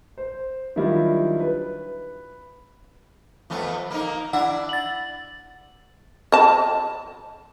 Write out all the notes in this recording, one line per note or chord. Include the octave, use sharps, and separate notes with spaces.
C5
D#3 F#3 G3 D4 E4 F4
B4
F2 A3 B3
A#3 D#4
D4 E4 E5 F#5
A6 F#7
D#5 A5